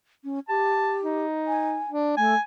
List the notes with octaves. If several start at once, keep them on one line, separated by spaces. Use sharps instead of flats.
C#4
G4 A5
D#4
G#5
D4
A3 G#5